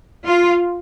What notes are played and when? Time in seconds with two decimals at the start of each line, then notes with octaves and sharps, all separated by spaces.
0.25 F4